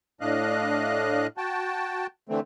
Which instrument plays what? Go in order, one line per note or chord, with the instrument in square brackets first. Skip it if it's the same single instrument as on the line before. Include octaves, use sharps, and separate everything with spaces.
[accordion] A2 D4 D#5 F5 F#6
F#4 G5 A5
D3 E3 A3 C4